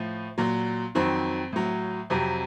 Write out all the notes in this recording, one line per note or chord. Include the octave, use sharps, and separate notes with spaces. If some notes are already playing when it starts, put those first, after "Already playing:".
Already playing: A2 F3
A#2 F#3
F2 D#3 F#3 C4
A2 F#3
F2 C3 F#3